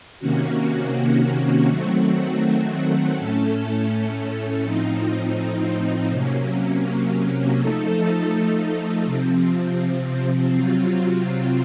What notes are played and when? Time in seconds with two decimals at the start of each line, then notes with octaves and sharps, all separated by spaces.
0.19 C3 D#3 A#3 C#4 F#4
1.68 D#3 F#3 A3 C4 F#4
3.15 A2 A3 C#4 A4
4.63 A2 F3 C4 D#4
6.10 C3 F#3 A#3 C#4
7.58 F3 A3 D#4 A4
9.05 C3 F3 C4
10.53 C3 F#3 C4 F4